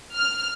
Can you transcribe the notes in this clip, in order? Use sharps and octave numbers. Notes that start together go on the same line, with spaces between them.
F6